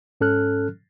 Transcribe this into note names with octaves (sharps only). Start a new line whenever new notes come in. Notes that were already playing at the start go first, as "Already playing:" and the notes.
G#2 C#4 A4 F6 F#6